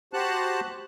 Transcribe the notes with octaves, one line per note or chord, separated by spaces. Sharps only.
F#4 G4 C5 F#5 A5 F#6